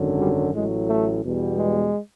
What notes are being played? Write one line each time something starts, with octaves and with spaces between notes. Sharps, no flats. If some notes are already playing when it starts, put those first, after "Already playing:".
Already playing: G#1 F#2 D3 F#3
G3
A1 A2 F#3 G#3
A3
E2 B2 G3
G#3